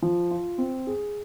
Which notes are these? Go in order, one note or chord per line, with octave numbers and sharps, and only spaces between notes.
F3
F4
C4
G#4